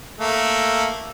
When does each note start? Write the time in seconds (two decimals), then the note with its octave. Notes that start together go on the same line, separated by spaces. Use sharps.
0.19 A3 A#3